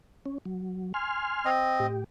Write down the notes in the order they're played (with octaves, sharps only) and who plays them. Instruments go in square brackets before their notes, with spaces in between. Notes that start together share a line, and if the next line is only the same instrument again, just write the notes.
[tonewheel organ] C#4
F#3
G#5 C6 F6
[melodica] C4 D#5
[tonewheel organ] A2 G4